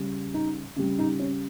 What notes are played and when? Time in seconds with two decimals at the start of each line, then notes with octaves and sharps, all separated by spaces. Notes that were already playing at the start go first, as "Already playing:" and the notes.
Already playing: C#3 G3
0.34 D#4
0.76 C#3 G3
0.99 D#4
1.19 C#4